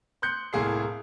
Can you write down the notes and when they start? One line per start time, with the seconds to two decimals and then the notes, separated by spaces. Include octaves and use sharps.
0.22 C6 F#6 G6 C#7
0.53 C2 A2 A#3 G#4 C6 C7